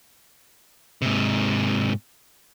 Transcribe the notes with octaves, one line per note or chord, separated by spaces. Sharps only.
G#2 C3